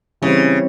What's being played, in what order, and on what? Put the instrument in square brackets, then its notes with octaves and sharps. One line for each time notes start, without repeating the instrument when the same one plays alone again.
[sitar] C#3 [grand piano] E3 G3 C4